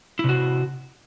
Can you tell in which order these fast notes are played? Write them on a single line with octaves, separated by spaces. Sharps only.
E4 C3 F#4